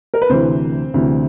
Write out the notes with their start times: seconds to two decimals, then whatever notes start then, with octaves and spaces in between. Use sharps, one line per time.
0.14 A#4
0.22 B4
0.29 D2 C3 E3 C4 C5
0.94 D2 C3 E3